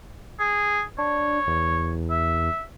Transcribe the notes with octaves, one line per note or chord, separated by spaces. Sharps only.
G#4
D4 C#5
E2
E5